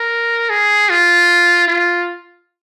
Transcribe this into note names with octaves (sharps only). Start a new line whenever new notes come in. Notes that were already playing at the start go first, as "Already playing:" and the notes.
Already playing: A#4
G#4
F4
F4